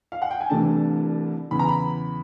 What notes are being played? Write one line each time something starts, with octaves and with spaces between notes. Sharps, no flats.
F5
F#5
G5
G#5
C2 C3 E3 A3 D4 A5
E2 C#3 E3 B5
A#5
B5